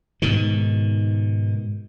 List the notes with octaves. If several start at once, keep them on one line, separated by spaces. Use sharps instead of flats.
G#2 B2 D#3